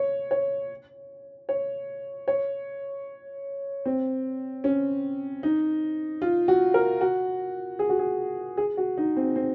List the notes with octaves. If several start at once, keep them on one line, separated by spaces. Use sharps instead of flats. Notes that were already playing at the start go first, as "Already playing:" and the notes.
Already playing: C#5
C#5
C#5
C#5
C4
C#4
D#4
F4
F#4
A#4
F#4
G#4
F#4
G#4
G#4
F#4
D#4
C4
C4